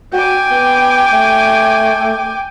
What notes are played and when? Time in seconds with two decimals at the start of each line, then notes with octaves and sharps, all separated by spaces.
0.13 F#4 G5 G#5 D6
0.51 B3
1.12 A3